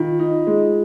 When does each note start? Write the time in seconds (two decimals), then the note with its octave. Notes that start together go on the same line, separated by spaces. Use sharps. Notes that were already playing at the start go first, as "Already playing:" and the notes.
Already playing: D#3 F4
0.19 D#4
0.47 G#3